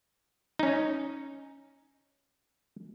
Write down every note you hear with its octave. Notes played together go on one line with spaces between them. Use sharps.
C#4 D#4